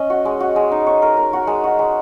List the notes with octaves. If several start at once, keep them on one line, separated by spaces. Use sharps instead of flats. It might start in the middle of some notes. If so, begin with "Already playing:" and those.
Already playing: C#4 D#5
F#4
G#3
F#4
G#3
D#4
C#5
A#4
A#4
F#4
G#3
F#4
G#3